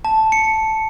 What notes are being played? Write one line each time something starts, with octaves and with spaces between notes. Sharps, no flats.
A5
C#7